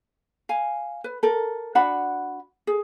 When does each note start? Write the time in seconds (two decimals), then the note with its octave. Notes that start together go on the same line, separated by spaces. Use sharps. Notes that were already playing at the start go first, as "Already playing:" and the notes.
0.49 F5 G#5
1.04 B4
1.23 A4 A#4
1.75 D4 F#4 F#5 B5
2.67 G#4